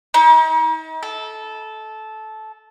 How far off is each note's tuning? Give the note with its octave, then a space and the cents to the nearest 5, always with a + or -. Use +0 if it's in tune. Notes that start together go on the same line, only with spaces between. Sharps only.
D#4 +40
A4 -15